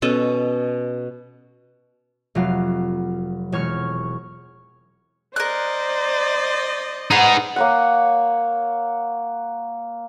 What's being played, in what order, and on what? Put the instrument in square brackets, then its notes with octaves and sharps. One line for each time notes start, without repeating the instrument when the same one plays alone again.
[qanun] B2 C#4 A4 D#5
[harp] F1 F#3 F5
E1 C#5 C#6 F6
[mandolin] A#4 F#6 [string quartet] C5 D5 D#5
[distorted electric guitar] D#4 G#4 [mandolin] B4 F#5
[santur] A#3 C#5 F#5